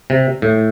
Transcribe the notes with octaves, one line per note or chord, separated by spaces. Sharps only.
C3
A2